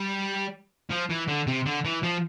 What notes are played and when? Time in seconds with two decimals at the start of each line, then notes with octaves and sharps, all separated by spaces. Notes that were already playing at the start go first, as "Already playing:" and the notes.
Already playing: G3
0.90 F3
1.10 E3
1.28 D3
1.47 C3
1.66 D3
1.85 E3
2.03 F3